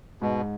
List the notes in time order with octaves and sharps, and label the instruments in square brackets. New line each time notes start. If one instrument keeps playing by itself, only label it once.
[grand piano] G#2 [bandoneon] B2